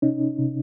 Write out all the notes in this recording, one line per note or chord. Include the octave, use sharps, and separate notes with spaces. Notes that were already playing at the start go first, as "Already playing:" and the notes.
C3 C#4 D#4
C3